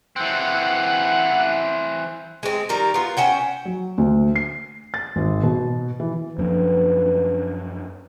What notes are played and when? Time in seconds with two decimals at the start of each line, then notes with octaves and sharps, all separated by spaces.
0.16 E3 C4 F#5 F#6
2.43 G#3 C4
2.69 D#3 G3 A#4
2.94 B3 F4
3.17 C#4 C5 F#5 G5
3.65 F#3
3.98 D2
4.36 C7
4.94 A6
5.16 G#1
5.43 B2
6.00 E3
6.38 F#2 F3 A#3 D4 B4